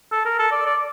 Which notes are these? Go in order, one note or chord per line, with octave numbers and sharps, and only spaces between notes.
A4
A#4
A4
D5
D5